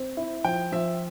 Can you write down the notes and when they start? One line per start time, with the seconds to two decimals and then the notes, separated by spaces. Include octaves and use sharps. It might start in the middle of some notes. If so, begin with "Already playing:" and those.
Already playing: C4
0.17 E4
0.44 F3 G5
0.72 F3 E5